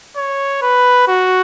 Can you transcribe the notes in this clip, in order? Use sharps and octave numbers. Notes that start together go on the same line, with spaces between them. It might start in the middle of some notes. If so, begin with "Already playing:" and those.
C#5
B4
F#4